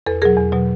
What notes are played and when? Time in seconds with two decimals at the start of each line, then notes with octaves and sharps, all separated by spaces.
0.06 E2 A4 B4
0.22 B2 F#3 G#4 A#4
0.37 E2
0.52 B2 F#3